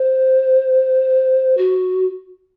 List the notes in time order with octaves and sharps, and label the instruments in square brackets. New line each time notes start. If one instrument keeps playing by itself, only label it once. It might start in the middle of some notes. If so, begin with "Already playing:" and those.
Already playing: [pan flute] C5
F#4